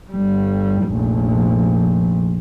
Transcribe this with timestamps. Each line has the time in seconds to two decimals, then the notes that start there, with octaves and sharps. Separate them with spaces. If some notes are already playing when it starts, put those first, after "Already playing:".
0.12 G1 G3
0.84 F1 A#1